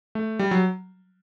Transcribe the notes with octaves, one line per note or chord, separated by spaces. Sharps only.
A3
G3
F#3